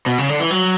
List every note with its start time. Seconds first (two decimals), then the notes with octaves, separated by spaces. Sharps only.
0.06 B2
0.18 C#3
0.29 D3
0.40 E3
0.50 F#3